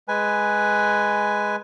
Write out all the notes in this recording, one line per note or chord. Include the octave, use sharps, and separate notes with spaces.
G#3 B4 G#5